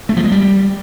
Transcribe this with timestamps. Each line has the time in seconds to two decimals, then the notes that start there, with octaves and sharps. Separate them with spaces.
0.09 A3
0.17 F3
0.24 G#3
0.32 G3